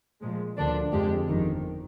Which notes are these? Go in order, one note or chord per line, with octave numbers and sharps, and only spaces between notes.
A#2 F3 G#3
D2 D3 F3 A#3 D4
F2 D3 G#3 D4 G4
G1 F2 D#3